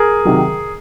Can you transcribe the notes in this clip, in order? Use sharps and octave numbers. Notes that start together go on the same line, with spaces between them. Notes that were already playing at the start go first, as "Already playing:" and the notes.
Already playing: G#4 A#4
C3 D#3 F#3